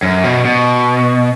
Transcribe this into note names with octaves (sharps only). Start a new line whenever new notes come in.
F#2
B2
B2